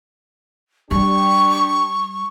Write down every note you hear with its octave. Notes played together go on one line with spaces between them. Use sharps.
G3 D4 G4 C#6